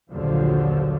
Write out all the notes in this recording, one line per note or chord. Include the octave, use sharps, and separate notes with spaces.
A#1 D#2 D3 F3 F#3